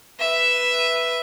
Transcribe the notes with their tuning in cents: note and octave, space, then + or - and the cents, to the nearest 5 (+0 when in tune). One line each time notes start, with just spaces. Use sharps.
B4 +0 E5 +0